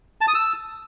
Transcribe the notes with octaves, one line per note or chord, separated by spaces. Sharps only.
A5
D#6
E6